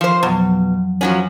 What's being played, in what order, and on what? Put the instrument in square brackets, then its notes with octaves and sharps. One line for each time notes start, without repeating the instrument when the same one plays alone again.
[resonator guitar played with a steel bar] F3 C5
[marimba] F2 F3 F#3 [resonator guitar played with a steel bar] B2
[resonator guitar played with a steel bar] F3 F#3 C#4